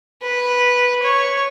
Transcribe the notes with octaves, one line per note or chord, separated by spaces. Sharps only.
B4
C#5